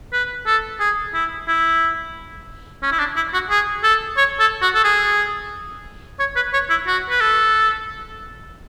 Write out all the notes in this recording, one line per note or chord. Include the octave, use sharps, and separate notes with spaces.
B4
A4
G#4
E4
E4
C#4
E4
D4
E4
F#4
G#4
A4
C#5
A4
F#4
A4
G#4
C#5
B4
C#5
E4
F#4
B4
A4